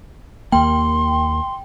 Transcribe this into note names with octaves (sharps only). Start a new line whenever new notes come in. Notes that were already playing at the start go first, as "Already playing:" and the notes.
D#2 A#3 G5 C6